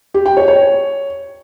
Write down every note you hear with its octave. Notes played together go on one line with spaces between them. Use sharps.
G4
G5
C#5
C#5